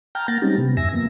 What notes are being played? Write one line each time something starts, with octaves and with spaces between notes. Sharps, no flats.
G5 A5 A#5 F6 G6
A#3 F#5 A6 A#6
G3 G#3 C4 C#4 D#4 G4
C3 B3
E2 G2 E5 G#5 E6 A#6
F3 A#3 B3